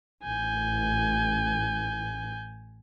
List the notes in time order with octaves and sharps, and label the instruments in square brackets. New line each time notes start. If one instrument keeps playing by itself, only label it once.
[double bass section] A1 [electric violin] G#5 G6